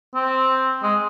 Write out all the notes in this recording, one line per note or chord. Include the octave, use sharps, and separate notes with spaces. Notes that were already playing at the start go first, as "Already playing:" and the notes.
C4
G#3